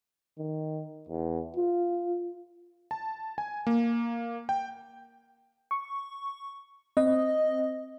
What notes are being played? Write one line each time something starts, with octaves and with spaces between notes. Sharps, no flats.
D#3
E2
F4
A5
G#5
A#3
G5
C#6
C4 D#5